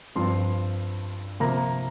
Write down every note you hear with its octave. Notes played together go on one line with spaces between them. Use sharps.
G2 F3 C4 C6
C3 F3 A#3 A#5